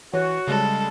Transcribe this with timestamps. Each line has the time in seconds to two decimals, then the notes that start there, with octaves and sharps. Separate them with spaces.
0.14 E3 F#4 C#5
0.48 C#3 G3 G#3 A4